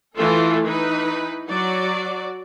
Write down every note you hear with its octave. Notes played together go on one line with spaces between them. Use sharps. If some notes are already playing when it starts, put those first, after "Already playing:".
E3 A3 F4 A4
E3 D#4 B4
F#3 F#4 D5